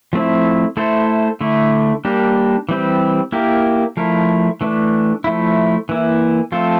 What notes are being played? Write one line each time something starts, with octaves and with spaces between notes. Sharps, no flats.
F3 A3 C4 E4
A3 E4 A4 C5
D3 A3 E4
G3 A#3 D4 G4 A#4
E3 G3 C4 G4
A#3 E4 G4 A#4
F3 A3 E4 A#4
E3 A3 D4
F3 A3 E4
E3 A#3 E4
F3 A3 C4 F4 A4